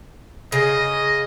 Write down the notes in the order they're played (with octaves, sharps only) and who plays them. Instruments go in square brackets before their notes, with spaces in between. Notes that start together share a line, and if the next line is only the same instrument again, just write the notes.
[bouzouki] C#3 [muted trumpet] D#5